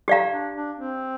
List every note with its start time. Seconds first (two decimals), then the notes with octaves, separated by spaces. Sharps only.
0.08 G4 D5 F5 A#5
0.31 D4
0.55 D4
0.78 C4